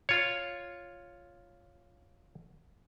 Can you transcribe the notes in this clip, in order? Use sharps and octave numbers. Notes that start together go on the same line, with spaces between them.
F4 C#5